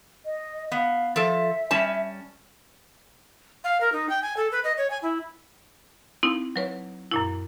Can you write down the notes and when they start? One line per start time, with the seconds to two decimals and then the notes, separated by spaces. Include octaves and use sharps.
0.25 D#5
0.72 B3 F5
1.16 F3 A4 E5
1.71 G3 C#4 A5
3.64 F5
3.81 A#4
3.92 D#4
4.09 G5
4.22 G#5
4.37 A4
4.52 B4
4.64 D#5
4.78 C#5
4.90 G#5
5.02 E4
6.23 C4 D#4 E4
6.56 F#3 B4 C#5
7.11 F#2 A#2 E4